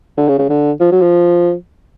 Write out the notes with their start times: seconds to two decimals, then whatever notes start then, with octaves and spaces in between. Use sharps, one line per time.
0.18 D3
0.28 C#3
0.39 C#3
0.50 D3
0.80 F3
0.92 F#3
1.02 F3